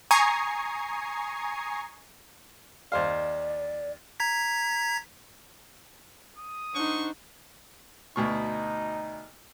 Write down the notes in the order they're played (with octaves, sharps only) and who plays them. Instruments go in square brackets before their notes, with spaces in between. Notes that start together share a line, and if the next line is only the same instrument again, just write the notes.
[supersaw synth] G#5 A#5 C#6 D#6 G#6 C7
[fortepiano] D#2 C5 F5 [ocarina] D5
[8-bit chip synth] A#5 G#6 B6
[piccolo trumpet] D#6
[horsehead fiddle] D4 D#4 [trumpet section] C5 F#5 C#6
[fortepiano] D2 B2 C#6 [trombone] D#4